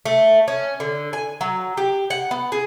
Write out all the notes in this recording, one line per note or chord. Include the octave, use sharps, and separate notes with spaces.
A3
C#4
D3
G#5
F#3
G4
F#5
B3
G#4